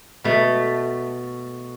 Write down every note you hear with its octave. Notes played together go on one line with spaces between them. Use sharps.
B2 A3